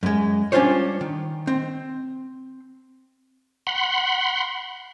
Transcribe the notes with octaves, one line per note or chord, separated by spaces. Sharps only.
F#2 G#3
G3 C#4 D4 F4 C5 C#5
D#3
C4
F#5 B5 C6